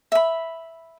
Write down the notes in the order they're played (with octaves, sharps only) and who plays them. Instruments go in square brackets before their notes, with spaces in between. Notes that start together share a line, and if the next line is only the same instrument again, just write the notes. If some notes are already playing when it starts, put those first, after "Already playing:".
[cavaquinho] E5 B5